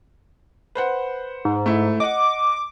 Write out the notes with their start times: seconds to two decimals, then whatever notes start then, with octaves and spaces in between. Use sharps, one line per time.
0.75 B4 C5 F#5
1.45 G#2
1.66 A3 E4
2.00 D#5 F#5 D6